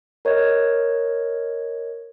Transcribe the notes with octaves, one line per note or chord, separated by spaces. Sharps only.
A#4 C#5 D#5 G#6